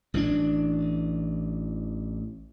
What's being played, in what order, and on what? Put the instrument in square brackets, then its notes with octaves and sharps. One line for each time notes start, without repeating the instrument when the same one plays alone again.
[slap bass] A1 E3 A#3 D4